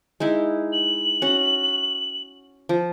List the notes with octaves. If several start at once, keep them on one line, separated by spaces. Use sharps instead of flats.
G#3 D#4 E4
F#7
C#4 F#4
F3